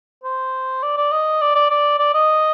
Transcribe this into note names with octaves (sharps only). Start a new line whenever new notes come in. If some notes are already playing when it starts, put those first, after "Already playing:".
C5
D5
D5
D#5
D5
D5
D5
D5
D#5